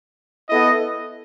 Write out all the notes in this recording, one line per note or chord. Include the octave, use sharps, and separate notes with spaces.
B3 E4 A4 D#5